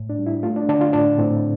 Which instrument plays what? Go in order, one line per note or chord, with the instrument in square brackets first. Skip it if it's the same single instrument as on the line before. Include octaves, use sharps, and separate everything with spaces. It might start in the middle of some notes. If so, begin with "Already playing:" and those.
Already playing: [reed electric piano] A2
D4
G3
E4
A3 F4
D4
D3 D4
F4
A2 D4
A2 C4